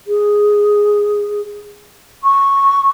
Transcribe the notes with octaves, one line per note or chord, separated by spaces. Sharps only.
G#4
C#6